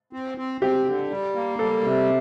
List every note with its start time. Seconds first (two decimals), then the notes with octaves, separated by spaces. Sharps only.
0.13 C4
0.38 C4
0.61 C4 G4
0.86 D3
1.10 G3
1.35 A#3
1.59 G3 A4
1.83 C3